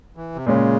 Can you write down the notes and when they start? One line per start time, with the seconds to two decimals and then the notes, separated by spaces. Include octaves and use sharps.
0.16 E3
0.35 C3
0.46 A#2 C#3 G#3 C#4